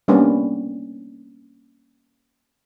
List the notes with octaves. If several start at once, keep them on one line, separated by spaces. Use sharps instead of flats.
G3 A#3 B3 C#4 D4